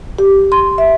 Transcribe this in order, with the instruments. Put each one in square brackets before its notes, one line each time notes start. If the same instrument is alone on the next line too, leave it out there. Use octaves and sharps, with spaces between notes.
[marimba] G4
C6
E5